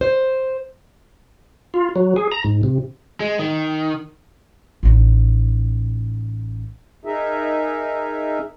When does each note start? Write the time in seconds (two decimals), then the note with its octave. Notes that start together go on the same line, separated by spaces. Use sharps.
0.01 C5
1.74 F4
1.96 F#3
2.16 G#4
2.32 A#5
2.44 G#2
2.63 C3
3.20 G#3
3.39 D#3
4.83 A1 D#4
7.05 D#4 G#4 A#4 E5